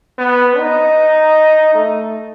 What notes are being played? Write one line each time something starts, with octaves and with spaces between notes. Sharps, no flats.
B3
D#4
A3